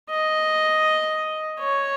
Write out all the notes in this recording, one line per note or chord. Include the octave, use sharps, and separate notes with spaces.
D#5
C#5